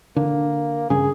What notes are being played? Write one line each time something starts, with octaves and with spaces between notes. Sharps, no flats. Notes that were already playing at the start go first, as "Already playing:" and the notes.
D3 A#3
G2 C#3 G#4